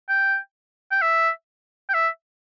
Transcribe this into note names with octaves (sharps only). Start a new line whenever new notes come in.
G5
G5
E5
G5
E5